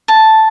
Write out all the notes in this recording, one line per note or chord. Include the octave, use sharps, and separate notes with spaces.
A5